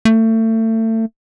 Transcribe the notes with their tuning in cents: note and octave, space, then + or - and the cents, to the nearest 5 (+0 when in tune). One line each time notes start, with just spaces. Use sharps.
A3 +30